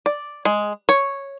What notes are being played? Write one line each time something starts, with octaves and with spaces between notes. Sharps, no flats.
D5
G#3
C#5